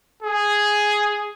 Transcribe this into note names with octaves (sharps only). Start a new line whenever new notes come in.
G#4